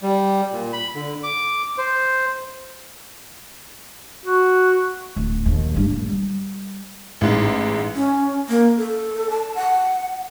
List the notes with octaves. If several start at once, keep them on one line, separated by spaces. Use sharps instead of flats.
G3
A#2
B5
D3
D6
C5
F#4
D1
A#1 D#2
A1 G2
A#2
G3
A1 G#2
C#4
A#3
A4
A5
F#5